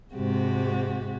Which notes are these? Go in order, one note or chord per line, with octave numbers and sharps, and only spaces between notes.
G#2 C3 G#3 F#4 G4